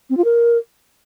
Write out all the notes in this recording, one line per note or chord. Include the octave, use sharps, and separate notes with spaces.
C4
F4
A#4